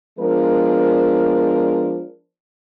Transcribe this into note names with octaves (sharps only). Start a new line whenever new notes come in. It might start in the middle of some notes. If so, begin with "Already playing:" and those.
F3 G#3 B3 D4 A#4